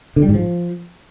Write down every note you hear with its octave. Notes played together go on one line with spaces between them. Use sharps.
D3
G3
G#2
F3